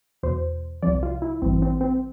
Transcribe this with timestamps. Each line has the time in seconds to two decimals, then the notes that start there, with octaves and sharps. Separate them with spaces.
0.23 E2 B2 C5
0.82 C2 C3 F3 D5
1.03 F4
1.22 E4
1.42 A1 G2 E3 C4
1.62 C4
1.81 C4